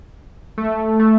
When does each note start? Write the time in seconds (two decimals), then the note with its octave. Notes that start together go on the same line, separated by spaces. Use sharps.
0.58 A3
0.99 A3